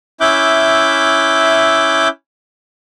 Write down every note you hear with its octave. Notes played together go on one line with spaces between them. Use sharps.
C#4 E4 E5 D6 F#6 G6